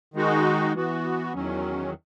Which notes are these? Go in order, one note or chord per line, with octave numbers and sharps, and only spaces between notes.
D#3 G#3 D#4 F#4
E3 B3 F#4
E2 D#3 F#3 C#4